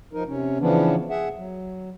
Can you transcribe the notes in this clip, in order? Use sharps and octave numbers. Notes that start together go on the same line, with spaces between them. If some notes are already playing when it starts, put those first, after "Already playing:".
F3 D#4 A#4
C3 C#4
C#3 E3 F3 B3 C#4 D4
G#4 E5 F#5
F#3